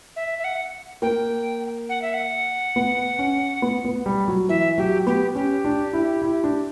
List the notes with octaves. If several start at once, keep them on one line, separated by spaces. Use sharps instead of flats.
E5
E5
F#5
A#3 G5
F#5
E5
F#5
B3
C#4
B3
B3
G3
F#3
E3 E5
F#3 G4
B3 G4
C#4 G4
D4
E4
E4
D4